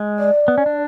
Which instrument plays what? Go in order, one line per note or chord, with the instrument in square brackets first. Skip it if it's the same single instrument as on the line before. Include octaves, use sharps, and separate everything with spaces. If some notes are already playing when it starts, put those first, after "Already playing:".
Already playing: [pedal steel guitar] G#3
[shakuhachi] D5
[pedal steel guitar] B3
C#4
D4